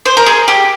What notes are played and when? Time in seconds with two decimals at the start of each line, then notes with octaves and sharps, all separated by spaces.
0.05 C5
0.17 A#4
0.26 G#4
0.48 G4